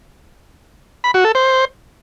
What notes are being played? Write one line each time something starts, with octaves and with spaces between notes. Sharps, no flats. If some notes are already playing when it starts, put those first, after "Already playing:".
B5
F#4
A4
C5